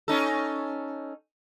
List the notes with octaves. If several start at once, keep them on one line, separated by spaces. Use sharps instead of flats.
C#4 D#4 A4